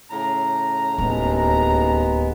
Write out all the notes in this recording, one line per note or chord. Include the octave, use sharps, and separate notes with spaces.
A2 C#3 A#5
D1 D#2 G#3 B3